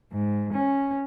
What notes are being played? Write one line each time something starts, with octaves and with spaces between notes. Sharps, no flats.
G#2
C#4